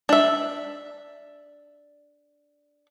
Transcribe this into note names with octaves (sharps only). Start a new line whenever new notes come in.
D4 E5